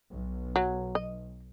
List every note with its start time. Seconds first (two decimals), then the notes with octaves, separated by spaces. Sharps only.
0.10 B1
0.56 F#3
0.95 D#5